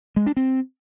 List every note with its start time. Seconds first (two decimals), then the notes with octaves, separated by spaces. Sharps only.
0.16 G#3
0.26 D4
0.37 C4